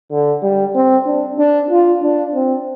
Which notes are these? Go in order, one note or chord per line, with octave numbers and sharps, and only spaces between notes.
D3
G3
C4
D4
D4
F4
D4
C4